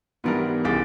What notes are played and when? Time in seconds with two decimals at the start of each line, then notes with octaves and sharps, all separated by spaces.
0.24 G#2 E3 G3 B3 D4 A#4
0.65 C2 C#4 G4 G#4 A6